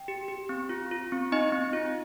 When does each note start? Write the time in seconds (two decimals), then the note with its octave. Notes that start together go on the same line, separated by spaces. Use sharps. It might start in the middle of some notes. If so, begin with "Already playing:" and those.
Already playing: G5
0.08 G4
0.28 G4
0.49 C4
0.69 F4
0.91 F4
1.12 C4
1.32 C4 D#4 D#5
1.52 C4
1.73 F4